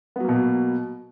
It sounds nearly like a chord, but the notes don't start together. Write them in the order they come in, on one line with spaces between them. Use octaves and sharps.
B3 F#3 A#3 B2